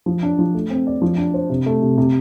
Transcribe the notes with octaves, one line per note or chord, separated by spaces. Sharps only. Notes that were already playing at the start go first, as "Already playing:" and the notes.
F3
D4
F3
A3
C4
D5
F3
D4
C5
C3
A3
C3
C3